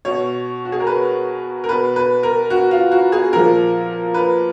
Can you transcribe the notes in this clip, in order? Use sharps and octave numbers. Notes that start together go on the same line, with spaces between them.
B2 C#5
F#4
G#4
A#4
B4
A#4
B2 B4
B4
A#4
F#4
F4
F#4
G#4
A#2 F3 A#4
B4